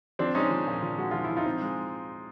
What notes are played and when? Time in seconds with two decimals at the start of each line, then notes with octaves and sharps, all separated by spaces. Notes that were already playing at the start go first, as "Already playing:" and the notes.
0.19 F3 C4 D4
0.35 G#3 C#4 D#4
0.51 F3
0.67 A#2
0.82 F3
0.98 G#3 F#4
1.11 F3 F4
1.24 E4
1.30 F3
1.37 D#4 F4
1.46 C4
1.62 G#3